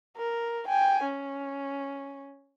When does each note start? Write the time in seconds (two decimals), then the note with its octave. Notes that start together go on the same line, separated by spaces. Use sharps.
0.17 A#4
0.68 G5 G#5
1.04 C#4